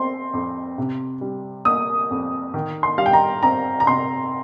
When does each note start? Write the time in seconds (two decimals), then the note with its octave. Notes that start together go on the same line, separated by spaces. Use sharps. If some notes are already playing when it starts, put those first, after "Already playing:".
Already playing: C4 C6
0.33 F2
0.78 C3
1.21 G3
1.65 A#3 D#6
2.11 F2
2.54 D#3
2.83 C6
2.98 G3 F5
3.06 G5
3.13 A#5
3.43 C4 A#5
3.80 A#5
3.87 C3 C6